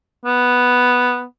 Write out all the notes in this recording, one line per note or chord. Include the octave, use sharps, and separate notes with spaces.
B3